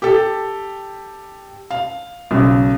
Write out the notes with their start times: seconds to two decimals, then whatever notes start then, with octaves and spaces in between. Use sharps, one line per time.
0.02 G4 A4
1.70 F5
2.31 B1 C#3